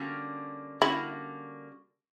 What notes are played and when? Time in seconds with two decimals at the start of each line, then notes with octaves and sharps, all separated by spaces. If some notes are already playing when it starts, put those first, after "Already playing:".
Already playing: D3 G3 A#3 C#4 F#4
0.81 D3 G3 A#3 C#4 E4 F#4